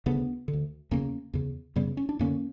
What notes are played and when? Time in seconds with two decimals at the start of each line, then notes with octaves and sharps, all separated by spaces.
0.06 D2 C#3 B3 D4
0.48 D3
0.53 D2
0.91 E2 C#3 A#3 C#4
1.33 E2 C#3
1.76 F#2 C#3 G3 B3
1.97 C#4
2.09 D4
2.19 F#2 D3 A#3 C#4